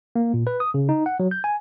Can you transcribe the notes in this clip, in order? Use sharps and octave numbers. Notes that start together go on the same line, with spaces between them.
A#3
A#2
B4
D#6
C#3
D#4
F#5
F#3
G6
G#5